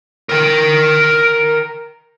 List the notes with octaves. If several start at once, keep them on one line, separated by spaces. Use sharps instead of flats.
A#4 G5